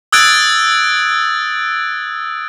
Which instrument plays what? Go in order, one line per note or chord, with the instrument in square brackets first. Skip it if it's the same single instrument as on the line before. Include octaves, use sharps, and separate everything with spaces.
[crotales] D#6 E6 F#6 G#6 A6 D7